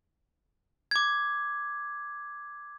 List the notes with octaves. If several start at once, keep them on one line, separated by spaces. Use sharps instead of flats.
D6 G#6